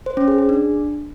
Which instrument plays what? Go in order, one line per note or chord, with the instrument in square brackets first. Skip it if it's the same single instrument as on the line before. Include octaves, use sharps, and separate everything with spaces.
[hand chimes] C5
C#4
G#4
G#4
D4